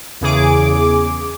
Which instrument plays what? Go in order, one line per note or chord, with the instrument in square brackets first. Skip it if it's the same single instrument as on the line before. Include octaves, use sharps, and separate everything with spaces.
[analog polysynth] E2 C#3 G#4 D6